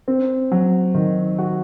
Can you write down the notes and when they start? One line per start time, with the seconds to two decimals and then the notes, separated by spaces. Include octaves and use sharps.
0.08 C4
0.52 F#3
0.94 D#3
1.39 F#4